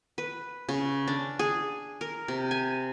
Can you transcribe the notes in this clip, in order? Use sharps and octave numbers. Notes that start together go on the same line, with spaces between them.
B4
C#3
D4
G#4
A#4
C3
G#5